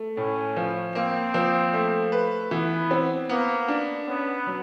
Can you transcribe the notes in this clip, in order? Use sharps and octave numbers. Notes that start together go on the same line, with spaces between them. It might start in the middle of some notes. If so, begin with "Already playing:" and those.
Already playing: A3
A2 C#4
F3
A#3 C4
F3
A3
B4
E3 B3
C4
A#3 B3
D4
B3 C#4
F#3